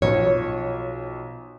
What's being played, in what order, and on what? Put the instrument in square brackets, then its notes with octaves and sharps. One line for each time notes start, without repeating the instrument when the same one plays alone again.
[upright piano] B1 F3 [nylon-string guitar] C#5